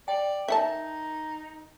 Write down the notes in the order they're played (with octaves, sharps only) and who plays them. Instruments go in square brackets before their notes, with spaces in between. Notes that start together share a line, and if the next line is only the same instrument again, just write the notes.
[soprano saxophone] D5 [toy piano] G5
[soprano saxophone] D#4 [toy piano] A#4 [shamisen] E5 F#5 A5